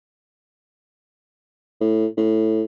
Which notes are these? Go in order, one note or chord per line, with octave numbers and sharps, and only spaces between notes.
A2
A2